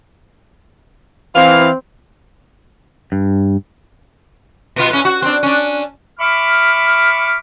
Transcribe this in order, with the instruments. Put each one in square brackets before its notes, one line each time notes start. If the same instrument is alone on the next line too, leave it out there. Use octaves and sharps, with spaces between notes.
[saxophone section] E3 F5 [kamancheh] C4
[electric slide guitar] G2
[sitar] B2 B3 F4
A2 C#4
F#4
C4 D4
C#4 D4
[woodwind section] E5 B5 C#6 D6 F6